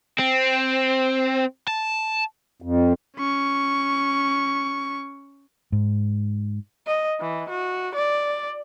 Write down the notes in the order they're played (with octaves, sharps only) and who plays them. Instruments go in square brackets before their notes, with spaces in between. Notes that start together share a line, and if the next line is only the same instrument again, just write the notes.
[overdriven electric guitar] C4
A5
[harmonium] F2
[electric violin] C#4 C#6
[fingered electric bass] G#2
[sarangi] D#5
E3
F#4
D5